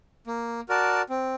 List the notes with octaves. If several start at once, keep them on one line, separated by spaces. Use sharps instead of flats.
A#3
F#4 A#4 D5 A5
C4